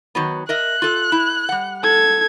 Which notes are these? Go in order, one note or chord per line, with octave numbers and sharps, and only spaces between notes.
D#3 F#3 B3
A#4 D#5 E5 F#6
F4 A4
E4
G3 F#5
A4 G#6